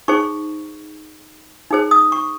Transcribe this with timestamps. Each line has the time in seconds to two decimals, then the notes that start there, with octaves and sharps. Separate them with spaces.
0.08 D#4 G#4 C5 C#6
1.71 D#4 G#4 C5
1.91 D#6
2.12 C#6